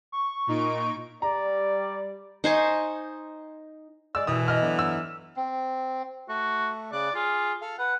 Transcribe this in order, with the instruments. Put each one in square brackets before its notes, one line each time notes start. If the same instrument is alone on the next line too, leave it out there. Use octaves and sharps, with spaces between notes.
[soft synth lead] C#6
[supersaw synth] A#2 D#4 D7
[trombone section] G3 [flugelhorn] D5 [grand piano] A#5
[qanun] D#4 C5 G#5 C#6
[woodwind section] G#3 D5 [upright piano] E6
[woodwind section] C2 B2 [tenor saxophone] E3 [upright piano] D#6
[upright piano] D#5 F6
[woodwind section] D3 F#3 B3
[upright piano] E6
[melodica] C4
[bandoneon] A3 [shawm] F#4
[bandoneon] C#3 F#6 [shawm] D5
[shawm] F4 [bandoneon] G#4
[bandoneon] A4 F5
[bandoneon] B4 [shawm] F#5